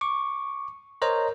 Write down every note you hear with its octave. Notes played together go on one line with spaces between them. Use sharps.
C#6 D6
A#4 C5 C#5 D#5 A#5